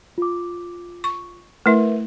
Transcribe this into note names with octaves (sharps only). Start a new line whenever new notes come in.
F4 D6
C#6
A3 E4 A#4 B4 E5